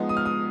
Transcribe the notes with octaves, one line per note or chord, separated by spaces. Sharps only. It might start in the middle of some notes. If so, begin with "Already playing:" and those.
Already playing: F3 G#3 B3 D#4
D#6
F6
D#6